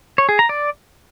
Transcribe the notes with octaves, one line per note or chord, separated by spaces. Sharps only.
C#5
G#4
A#5
D5